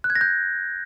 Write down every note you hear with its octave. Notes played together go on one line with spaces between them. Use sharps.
F#6
G#6
A#6
G6